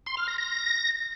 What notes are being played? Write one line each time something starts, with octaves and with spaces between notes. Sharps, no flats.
C6
F6
A#6
A#6